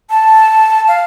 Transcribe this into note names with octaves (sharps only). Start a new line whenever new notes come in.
A5
F5